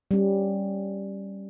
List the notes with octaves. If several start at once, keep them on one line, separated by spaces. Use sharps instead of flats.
G3 C#4